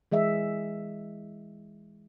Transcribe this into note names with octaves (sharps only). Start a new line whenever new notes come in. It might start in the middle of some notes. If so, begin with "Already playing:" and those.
E3 G#3 D#5 E5